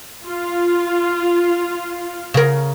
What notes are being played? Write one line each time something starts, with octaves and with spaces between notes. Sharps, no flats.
F4
C#3 A#4